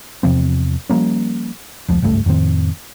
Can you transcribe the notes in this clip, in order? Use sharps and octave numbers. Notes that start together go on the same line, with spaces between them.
E2 C3 F3 C4
F3 G3 A#3 C#4
F1 C#2 F3
G#1 C#2 G2 A3
F2 A2 D#3 C4